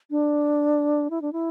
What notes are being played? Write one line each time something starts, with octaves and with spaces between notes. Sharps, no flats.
D4
E4
D4
E4